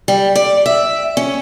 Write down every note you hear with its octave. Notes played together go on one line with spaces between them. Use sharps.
G3
D5
E5
C#4